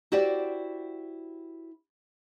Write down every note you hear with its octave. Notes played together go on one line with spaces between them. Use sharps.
E4 F#4 G4 C5 D5